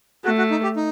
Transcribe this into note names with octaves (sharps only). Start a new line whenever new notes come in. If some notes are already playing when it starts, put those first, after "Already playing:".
A3 F#4
F#4
D#4
G4
D#4